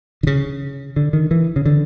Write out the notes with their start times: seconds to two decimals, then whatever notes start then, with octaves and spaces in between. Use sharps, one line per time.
0.23 D3
0.27 C#3
0.96 D3
1.13 D#3
1.31 E3
1.56 C#3
1.66 D3